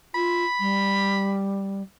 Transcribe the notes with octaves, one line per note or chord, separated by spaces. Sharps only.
F4 B5
G3